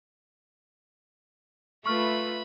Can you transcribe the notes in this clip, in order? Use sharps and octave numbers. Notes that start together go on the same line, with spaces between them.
A3 F4 B4 E5 B5 C#6 F6